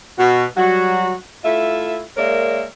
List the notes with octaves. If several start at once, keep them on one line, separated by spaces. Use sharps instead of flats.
B2 F#4
F#3 G3 F#4
A3 E4 F4 E5
G#3 A#3 A#4 C#5 D5 E5